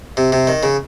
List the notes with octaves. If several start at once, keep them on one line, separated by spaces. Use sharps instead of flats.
C3
C3
D#3
C#3